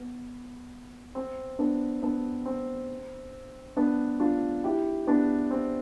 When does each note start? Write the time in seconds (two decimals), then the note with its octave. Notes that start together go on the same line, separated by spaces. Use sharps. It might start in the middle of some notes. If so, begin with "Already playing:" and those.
Already playing: B3
1.15 C4
1.59 B3 D4
2.02 B3 D4
2.46 C4
3.77 B3 D4
4.20 D4 F4
4.64 E4 G4
5.07 B3 D4
5.51 C4